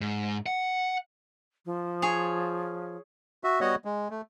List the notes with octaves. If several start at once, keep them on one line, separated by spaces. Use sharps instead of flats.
G#2
F#5
F3
G#4 C#5
F#4 E5
G3 B3 F#4 C#5 D#5 F#5
G#3
A3